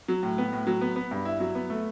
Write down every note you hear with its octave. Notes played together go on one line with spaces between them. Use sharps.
F#3
A2
B3
A2
F#3
B3
B3
G2
E4
F#3
B3
A3